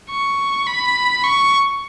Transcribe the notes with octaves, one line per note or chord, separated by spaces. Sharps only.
C#6
B5
C#6